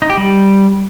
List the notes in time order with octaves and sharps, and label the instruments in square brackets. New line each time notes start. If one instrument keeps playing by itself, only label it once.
[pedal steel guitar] D#4
G4
G3